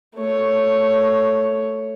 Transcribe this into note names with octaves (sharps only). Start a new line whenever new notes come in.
A3 C#5